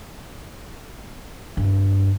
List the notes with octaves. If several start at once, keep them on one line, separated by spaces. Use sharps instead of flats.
G2